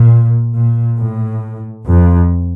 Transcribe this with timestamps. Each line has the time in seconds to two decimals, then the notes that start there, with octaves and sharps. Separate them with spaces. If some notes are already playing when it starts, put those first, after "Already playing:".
Already playing: A#2
0.54 A#2
0.97 A2
1.86 F2